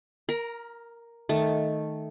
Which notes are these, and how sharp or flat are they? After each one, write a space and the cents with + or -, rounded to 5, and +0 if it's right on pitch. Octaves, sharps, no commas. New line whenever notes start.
A#4 +0 A#5 +35
D#3 +0 A3 +0